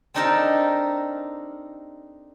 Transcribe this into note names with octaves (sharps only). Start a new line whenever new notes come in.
C4 D4 D#4 G4 A4 A#4